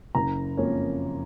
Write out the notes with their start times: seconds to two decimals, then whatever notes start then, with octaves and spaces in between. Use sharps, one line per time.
0.15 F#1 A#5
0.57 F2 F3 A#3 C#4